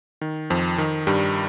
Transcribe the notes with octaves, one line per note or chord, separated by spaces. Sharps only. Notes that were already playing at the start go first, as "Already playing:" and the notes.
D#3
F2 F3
D#3
G2 G3